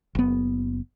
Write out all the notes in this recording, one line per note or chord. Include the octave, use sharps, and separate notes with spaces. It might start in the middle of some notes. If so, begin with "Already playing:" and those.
F#1 B3